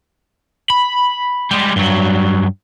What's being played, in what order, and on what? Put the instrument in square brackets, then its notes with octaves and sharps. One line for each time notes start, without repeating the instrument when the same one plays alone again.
[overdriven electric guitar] B5
G3 G#3
G2 F#3